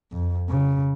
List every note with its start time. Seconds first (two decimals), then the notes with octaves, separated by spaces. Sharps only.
0.12 F2
0.49 C#3